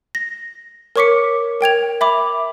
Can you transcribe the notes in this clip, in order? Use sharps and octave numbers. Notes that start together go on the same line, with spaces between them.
A#6
A#4 C#5 C#6 D6 B6 C#7
A#4 G5 G#6 F7
E5 B5 D6